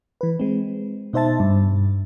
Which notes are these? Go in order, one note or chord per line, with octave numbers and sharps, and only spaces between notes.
E3 B4
G#3 C4
B2 D#4 C5 E5 A5 A6
G2